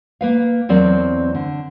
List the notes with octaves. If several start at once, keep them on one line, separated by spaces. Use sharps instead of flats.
A#3 B4 F5
E2 F#3 C4 A#4 D5
D3